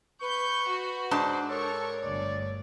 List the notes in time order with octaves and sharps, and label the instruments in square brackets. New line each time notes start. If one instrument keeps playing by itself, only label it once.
[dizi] B4 [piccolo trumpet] C#6 [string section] G6
[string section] F#4
[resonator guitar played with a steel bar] G#2 D4 A5 [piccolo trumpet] C5
[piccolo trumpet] A4 [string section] A#4 C#6 [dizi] C#5
[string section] G1 D2 [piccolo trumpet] D5